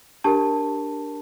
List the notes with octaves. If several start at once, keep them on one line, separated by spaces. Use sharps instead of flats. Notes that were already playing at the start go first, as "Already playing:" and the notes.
D4 G4 A#4 A5